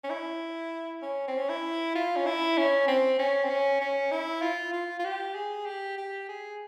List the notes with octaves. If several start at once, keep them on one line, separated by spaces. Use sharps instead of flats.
C#4
E4
C#4
C4
C#4
E4
F4
C#4
E4
C#4
C4
C#4
C4
C#4
C#4
E4
F4
F4
F4
G4
G#4
G4
G4
G#4